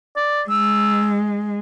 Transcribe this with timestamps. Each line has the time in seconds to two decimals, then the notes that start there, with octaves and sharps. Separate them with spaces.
0.16 D5
0.50 G#3 E6